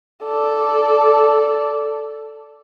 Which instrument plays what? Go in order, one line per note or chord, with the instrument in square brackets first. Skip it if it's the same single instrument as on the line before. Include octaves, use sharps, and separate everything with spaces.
[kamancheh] A4 D5